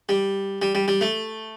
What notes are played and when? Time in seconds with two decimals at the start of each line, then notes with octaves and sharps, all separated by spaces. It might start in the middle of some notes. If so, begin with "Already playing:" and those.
0.09 G3
0.62 G3
0.75 G3
0.88 G3
1.01 A3